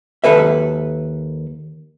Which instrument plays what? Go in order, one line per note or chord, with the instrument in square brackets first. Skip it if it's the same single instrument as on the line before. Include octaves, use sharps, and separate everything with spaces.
[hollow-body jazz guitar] D#2 A4 B4 E5